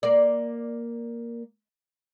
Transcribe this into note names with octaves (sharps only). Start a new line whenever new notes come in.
A#3 D5